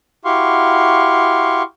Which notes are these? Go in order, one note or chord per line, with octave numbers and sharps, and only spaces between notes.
E4 F#4 G4 F5 C6 C#6